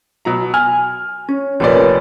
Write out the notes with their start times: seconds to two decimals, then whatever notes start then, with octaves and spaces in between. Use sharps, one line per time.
0.25 B2 F#3 A#5
0.54 G#5 F6
1.29 C#4 C#5
1.60 F1 A#2 A#4 B4 C#5 D5